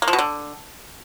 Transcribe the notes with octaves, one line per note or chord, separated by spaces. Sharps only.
A#3
F3
B2
D3